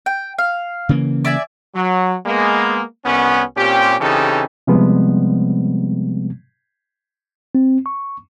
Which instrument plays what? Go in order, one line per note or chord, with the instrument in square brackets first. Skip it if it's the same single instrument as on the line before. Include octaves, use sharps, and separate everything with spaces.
[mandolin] G5
F5
[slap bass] C#3 E3 A#3
[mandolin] D5 E5 G#5
[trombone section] F#3
G#3 A#3 B3
C2 B3 C#4
A#2 C4 C#4 G4
C#3 E3 C4 D#4 G4 A4
[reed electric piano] C3 F3 G3 G#3 B3 C4
[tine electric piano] C4
C#6